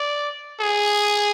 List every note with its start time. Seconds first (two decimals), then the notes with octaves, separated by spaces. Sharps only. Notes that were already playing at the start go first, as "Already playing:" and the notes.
Already playing: D5
0.61 G#4